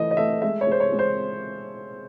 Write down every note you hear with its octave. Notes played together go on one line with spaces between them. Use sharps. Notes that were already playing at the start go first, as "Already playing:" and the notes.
Already playing: E3 A3 D#5
D#5
A3 E5
G#3 E5
C#5
G#3 C5
C#5
G#3
C5